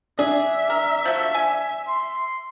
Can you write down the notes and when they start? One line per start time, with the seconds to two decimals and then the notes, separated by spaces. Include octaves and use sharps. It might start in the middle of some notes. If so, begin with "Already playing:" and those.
0.19 D4 G#4 E5
0.70 A#4
1.05 F3 A3 F#4
1.34 G#5
1.88 C6